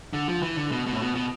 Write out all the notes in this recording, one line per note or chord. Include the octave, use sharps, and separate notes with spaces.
D3
F3
E3
D3
B2
B2
A2
B2
B2